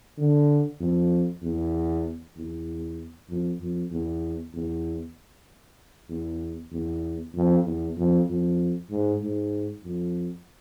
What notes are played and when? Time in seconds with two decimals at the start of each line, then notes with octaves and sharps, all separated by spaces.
0.18 D3
0.80 F2
1.43 E2
2.37 E2
3.29 F2
3.60 F2
3.92 E2
4.54 E2
6.09 E2
6.72 E2
7.34 F2
7.65 E2
7.97 F2
8.27 F2
8.90 G#2
9.21 G#2
9.84 F2